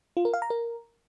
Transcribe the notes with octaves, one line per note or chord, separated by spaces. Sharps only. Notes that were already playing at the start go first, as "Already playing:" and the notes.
F4
A#4
F5
A#5
A#4